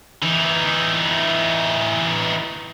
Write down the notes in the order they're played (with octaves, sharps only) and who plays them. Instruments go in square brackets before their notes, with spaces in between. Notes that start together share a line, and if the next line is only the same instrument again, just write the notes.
[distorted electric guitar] E3 D#4